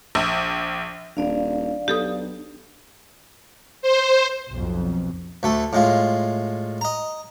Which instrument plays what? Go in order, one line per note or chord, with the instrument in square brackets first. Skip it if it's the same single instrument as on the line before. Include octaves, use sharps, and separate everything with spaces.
[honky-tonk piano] A#1
[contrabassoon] D#1 [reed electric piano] D4 [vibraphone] D5 F5
[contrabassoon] B1 [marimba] G4 A4 D#6
[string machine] C5
[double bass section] B1 F2
[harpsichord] D2 A3 A4
A2 G#3 F4
D#5 A#5